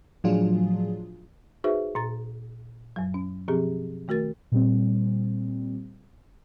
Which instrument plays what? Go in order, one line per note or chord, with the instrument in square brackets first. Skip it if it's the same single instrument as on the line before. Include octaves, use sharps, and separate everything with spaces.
[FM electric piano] A2 F3 F#3 D4 F4 G#4
[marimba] D#4 F#4 G#4 B4 C5 E5
A#2 A#5 A6
F#2 F#3
C#4
B2 F3 C4 G4 G#4
D#3 A3 F#4 A#4 A6
[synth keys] A#2 G3 C4